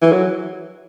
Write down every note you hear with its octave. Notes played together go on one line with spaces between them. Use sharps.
E3
F#3